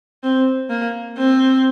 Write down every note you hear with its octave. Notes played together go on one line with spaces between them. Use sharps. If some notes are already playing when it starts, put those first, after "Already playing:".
C4
A#3
C4